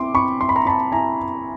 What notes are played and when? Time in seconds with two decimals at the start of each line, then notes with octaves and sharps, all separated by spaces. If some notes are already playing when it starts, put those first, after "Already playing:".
Already playing: C4 E4 C6 D6
0.14 C4 B5 C#6
0.40 E4 C6
0.49 B5
0.56 A#5 C6
0.66 C4 A5 B5
0.92 E4 G#5 A#5